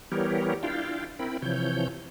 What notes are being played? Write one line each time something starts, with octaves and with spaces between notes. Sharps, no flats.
E3 G3 B3 G4 A#4 C#5
D4 E4 F4 F5 G5
C4 E4 A#4 G5 B5
C3 E3 F3 C#5 G6